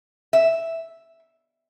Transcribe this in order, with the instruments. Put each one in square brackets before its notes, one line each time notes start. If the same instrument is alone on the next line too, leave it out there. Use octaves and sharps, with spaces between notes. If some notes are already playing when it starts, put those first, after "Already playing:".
[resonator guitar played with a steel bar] E5